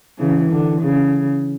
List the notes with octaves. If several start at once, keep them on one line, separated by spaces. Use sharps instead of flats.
C#3 E3
D3
C#3